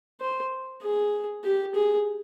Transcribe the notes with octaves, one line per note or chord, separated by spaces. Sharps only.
C5
G#4
G4
G#4